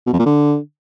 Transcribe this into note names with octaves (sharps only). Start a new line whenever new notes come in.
B2
F2
A#2
D3